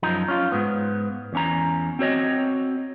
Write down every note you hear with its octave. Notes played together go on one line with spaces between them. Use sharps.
F#2 F3 D#4 A#5
C#4 F4
G#2 B3
E2 C#4 A#5
C4 F#4 C#5 D#5